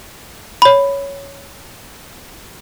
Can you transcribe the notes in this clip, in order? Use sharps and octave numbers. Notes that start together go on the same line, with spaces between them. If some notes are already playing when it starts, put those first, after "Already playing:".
C#5 B5